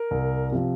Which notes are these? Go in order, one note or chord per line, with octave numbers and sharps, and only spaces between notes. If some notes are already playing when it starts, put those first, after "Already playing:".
Already playing: A#4
C2
C3 F3